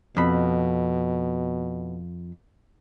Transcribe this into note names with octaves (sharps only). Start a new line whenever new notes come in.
F2 B2 B5